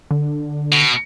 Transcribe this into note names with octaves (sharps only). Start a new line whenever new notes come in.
D3
B2